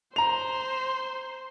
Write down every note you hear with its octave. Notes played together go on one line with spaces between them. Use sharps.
C5 A#5 F7